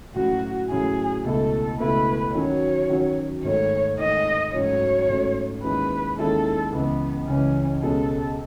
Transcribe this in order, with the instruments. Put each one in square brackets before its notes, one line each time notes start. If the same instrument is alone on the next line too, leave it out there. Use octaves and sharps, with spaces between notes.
[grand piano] A2 F#3 C#4 E4 [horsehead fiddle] F#4
[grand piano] A2 F#3 C#4 E4 [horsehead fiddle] G#4
[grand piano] C#2 B2 A3 E4 [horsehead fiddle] A4
[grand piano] C#2 B2 A3 E4 [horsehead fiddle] B4
[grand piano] D#3 F#3 C#4 F#4 [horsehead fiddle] C#5
[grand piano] D#3 F#3 C#4 F#4
[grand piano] G#2 D#3 A3 [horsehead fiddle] C#5
[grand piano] G#2 D#3 A3 [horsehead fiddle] D#5
[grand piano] G#2 F#3 A3 C#4 F#4 [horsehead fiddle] C#5
[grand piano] G#2 F#3 A3 C#4 F#4
[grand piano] D#2 D#3 G#3 C#4 E4 [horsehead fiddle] B4
[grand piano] D#2 D#3 G#3 C#4 E4 [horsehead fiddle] A4
[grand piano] C#2 C#3 E3 [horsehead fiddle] B3
[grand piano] C#2 C#3 E3 [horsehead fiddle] C#4
[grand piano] C#2 B2 G#3 C#4 [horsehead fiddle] A4